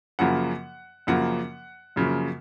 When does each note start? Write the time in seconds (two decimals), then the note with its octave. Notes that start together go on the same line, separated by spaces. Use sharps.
0.19 F#2 C#3 F3 A#3 F#5
1.07 F#2 C#3 F3 A#3 F#5
1.96 F#2 C#3 F3 A#3